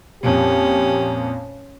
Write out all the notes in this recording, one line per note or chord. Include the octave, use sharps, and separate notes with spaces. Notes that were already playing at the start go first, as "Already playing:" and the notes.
F2 A#2 C#4 G4